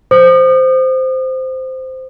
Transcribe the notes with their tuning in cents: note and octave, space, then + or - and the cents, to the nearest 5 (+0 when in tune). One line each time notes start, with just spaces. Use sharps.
C5 -10 D#6 -40